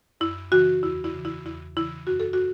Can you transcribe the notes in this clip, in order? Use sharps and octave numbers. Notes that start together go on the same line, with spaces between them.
F#2 E4
C#3 E3 F#4
E2 E4
E4
C#3 E3
E4
E2 E4
C#3 E3 E4
F#2 F#4
A4
F#4